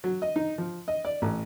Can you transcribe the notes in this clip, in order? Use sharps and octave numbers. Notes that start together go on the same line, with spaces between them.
F#3
D#5
D#4
F3
D#5
D5
A1